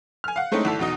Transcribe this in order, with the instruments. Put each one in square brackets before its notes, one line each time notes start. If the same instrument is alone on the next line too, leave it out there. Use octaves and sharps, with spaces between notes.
[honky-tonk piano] G#5 F6
F5 F#5
G#3 A3 C4 C#4 D#4 E4
G#1 E4 A4
E2 B2 D#4 D#5